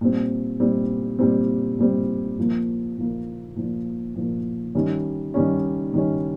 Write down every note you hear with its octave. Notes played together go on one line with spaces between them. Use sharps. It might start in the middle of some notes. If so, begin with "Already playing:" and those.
A#2 G3 C4
A#2 G3 C4
A#2 G3 C4
A#2 G3 C4
A#2 F3 A#3
A#2 F3 A#3
A#2 F3 A#3
A#2 F3 A#3
D#3 G3 C#4
D#3 G3 C#4
D#3 G3 C#4